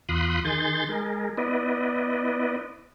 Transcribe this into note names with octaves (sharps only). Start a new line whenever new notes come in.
E2 F4 B5 C6 D#6 F#6
D#3 G#4 C6 G6 A6
G#3 G#4 A#4
B3 E4 B4 D5 D#5